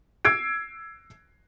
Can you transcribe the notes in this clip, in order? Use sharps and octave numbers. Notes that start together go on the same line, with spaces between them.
E6 G#6 C7 D7